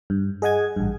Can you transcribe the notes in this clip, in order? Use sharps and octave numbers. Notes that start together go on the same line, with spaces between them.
G2
G#4 D#5 F#5 G#5 G#6
A1 G2